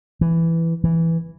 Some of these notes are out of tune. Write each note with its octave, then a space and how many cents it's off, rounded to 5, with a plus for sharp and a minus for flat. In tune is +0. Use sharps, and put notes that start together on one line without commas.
E3 +5
E3 +0